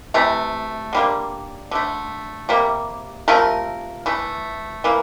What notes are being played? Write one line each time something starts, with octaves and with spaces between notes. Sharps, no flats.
C3 E3 A3
D3 G3 A#3
D3 A3
C3 G3 A#3
C3 F3 A3 A#4
E3 A3
E3 A#3